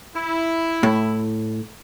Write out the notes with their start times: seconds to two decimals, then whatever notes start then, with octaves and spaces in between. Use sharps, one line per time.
0.15 E4
0.83 A2